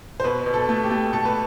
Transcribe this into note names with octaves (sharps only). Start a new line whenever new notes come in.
C5
B2 B4
B2
A4
A3
G4
A3
B2 A4
B4